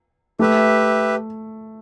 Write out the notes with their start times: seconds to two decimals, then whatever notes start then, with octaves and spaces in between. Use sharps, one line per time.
0.39 A3 G4 B4 E5